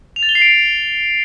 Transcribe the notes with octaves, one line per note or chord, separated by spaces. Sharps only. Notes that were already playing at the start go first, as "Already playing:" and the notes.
F7
A6
G7
C7
D7